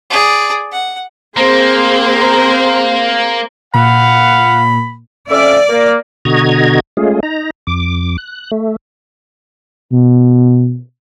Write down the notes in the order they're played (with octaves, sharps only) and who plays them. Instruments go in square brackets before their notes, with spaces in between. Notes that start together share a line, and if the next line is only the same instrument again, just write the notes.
[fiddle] G#4 D5
F#5
[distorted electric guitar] A#3 [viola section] C4 G#4 C5
[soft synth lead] A#2 [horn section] F5 F#5 [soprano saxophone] B5
[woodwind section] F2 C#4 E5 [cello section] D5
[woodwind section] A#3
[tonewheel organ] B2 D3 F#4 D#5 A#5 G#6
G#3 A3 C#4 F4 G#4
D#4 A#5
F2 D6
F#6
A3
[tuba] B2